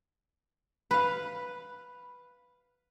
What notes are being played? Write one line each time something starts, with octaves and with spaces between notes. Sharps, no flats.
B4 F5